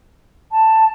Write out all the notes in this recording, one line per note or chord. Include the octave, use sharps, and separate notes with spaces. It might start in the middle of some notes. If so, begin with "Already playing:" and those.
A5